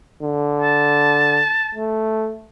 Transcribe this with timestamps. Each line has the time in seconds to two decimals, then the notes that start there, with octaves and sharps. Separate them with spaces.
0.23 D3
0.62 A5
1.75 A3